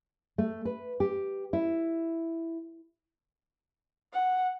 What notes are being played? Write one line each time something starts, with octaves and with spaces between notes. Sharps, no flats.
A3
B4
G4
E4
F#5